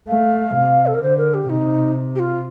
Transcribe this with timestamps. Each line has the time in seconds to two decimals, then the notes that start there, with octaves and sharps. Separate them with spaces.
0.09 A3 F5
0.56 C3
0.87 A4
0.95 A#4
1.02 D3 C5
1.18 A#4
1.34 G4
1.49 C3 D#4
2.16 G4
2.20 F4